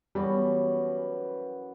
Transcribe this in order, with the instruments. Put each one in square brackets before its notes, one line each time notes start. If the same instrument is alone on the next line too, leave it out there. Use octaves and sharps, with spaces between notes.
[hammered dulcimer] F#2 E3 B3 F#4 [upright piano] G3